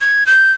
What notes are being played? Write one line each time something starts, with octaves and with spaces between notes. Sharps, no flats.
G#6
G6